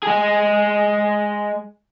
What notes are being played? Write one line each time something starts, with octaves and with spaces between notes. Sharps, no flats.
G#3 G#4